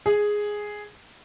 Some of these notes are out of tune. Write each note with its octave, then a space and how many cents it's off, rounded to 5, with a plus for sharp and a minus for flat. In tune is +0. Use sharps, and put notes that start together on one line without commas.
G#4 +0